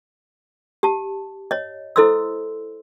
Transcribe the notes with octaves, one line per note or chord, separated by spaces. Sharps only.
G4 A5
C#5 D#5
E4 A4 C5 D#5 C6 E6